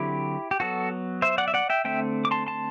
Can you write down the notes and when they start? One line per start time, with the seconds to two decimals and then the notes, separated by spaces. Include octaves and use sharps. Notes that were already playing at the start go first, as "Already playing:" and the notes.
Already playing: D3 F#3 C4 E4 G4
0.51 G4
0.60 F#3 B3 F#4 A4
1.22 C5 E5
1.38 D5 F#5
1.48 E5
1.54 D5 F#5
1.70 E5 G5
1.85 D3 A3 C4 E5 G5
2.25 D6
2.31 A5 C6
2.47 A5 C6